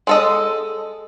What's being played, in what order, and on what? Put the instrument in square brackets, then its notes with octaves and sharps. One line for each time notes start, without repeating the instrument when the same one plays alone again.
[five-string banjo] G#3 A4 D#5